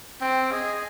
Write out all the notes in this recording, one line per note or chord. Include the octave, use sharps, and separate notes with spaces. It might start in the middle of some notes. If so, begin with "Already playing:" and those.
C4 G5
G#4 D#5